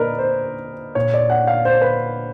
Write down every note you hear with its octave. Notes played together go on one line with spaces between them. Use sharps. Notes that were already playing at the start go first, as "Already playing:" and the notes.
Already playing: A#2 A#4 B4 D5 D#5
C5
A#2 C#5
D5
F#5
F5
C5
B4